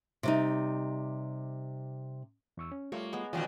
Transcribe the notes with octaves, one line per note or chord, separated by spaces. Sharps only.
C3 G3 D#4
E2 C#6 E6
C#4
G3 A3 A#3 F4 C#5
G#3 B3 G#4
B2 D#3 E3 F#3 G3 C#4 F4